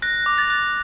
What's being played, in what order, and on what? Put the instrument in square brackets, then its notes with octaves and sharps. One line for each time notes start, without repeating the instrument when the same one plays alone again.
[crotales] F#6 A#6
D6
A6
F#6